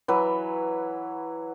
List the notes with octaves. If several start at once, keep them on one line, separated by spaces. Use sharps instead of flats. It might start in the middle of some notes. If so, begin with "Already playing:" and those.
E3 F#3 B4